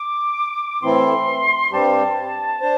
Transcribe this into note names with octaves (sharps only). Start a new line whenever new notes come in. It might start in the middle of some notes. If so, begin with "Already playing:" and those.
Already playing: D6
A2 E3 C4 E4 A4 C6
G2 G3 C4 G4 A5
D4 C5